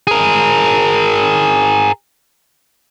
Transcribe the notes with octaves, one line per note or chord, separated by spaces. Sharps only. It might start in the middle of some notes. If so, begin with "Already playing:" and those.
G#4 A#4